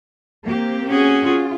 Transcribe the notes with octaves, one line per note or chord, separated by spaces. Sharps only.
A#3 C4 G4
C#4 F#4 G#4
F4